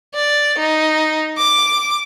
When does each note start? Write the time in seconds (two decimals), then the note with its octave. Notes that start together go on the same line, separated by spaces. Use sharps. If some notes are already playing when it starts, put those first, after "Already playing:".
0.14 D5
0.58 D#4
1.38 D6